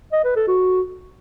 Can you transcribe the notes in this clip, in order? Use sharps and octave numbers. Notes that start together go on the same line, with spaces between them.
D#5
B4
A4
F#4